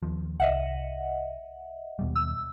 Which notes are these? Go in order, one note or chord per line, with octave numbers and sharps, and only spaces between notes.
D#2 F3
C2 D#5 E5 F#5
D#2 B2 G3
E6